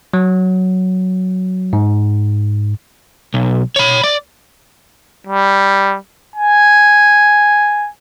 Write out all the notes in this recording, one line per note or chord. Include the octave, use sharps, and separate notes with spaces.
F#3
G#2
B1
C#5 B5
D5
G3
G#5